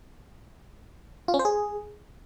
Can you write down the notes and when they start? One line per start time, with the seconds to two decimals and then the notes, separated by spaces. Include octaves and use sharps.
1.28 F4
1.34 C#4
1.39 C5
1.45 G#4